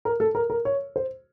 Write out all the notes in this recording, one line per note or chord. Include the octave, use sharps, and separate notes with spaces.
A#4
A4
A#4
A#4
C#5
C5